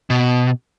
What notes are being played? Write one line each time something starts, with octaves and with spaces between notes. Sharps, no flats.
B2